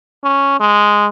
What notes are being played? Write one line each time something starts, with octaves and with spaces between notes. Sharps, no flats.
C#4
G#3